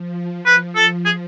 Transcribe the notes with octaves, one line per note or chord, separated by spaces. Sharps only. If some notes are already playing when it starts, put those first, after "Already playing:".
Already playing: F3
B4
A4
G#4